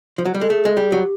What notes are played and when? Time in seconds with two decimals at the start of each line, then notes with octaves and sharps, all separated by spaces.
0.18 F3
0.25 F#3
0.34 G3
0.40 G#3 A4
0.50 A3 G#4
0.65 G#3
0.77 G3
0.90 F#3 G4